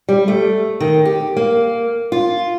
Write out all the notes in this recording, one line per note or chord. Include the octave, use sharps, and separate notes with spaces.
G3
A3
D#3
G4
A#3
F4